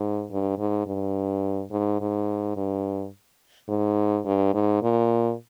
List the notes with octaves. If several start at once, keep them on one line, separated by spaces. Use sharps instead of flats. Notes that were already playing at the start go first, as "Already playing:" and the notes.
Already playing: G#2
G2
G#2
G2
G#2
G#2
G2
G#2
G2
G#2
A#2